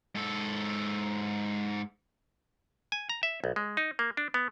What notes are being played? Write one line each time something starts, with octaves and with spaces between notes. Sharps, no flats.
G#2 A4
G#5
A#5
E5
B1
G#3
D#4
A#3
D4
B3